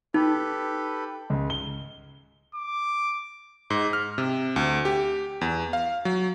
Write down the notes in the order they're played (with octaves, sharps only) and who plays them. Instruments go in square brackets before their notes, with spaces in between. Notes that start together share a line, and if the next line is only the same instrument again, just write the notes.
[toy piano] D#4 [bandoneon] G4 A4 B4
[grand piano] C#2
G7
[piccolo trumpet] D6
[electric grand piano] G#2
F6
C3
D2
G4
E2
F5
F#3